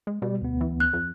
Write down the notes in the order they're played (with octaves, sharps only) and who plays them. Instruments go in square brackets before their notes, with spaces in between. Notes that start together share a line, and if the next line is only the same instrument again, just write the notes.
[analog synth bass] G#3
[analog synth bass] B2 [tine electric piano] G3
[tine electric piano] D2 B3
[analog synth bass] E3
[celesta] F#6
[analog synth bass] F2